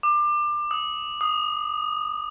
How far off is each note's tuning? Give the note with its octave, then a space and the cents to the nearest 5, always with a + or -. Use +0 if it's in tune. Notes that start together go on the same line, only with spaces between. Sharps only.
D6 +25
D#6 +25
D#6 -5